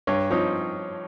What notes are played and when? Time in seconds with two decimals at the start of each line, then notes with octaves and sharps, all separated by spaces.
0.07 G2 C#5
0.30 F3 C4 D#4 C#5